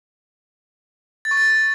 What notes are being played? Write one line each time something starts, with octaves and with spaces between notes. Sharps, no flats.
A6
C#6
A6